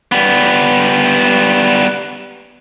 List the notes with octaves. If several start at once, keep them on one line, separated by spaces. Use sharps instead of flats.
G3 B3